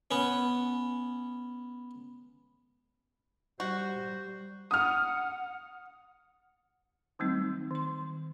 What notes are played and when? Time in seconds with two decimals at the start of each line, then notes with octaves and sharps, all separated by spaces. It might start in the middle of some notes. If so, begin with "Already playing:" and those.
0.11 B3 C#4
3.60 G3 F#4 C5
4.71 F#5 D#6 F6
7.19 D#3 F#3 G3 A3 C4 D#4
7.71 D#3 C6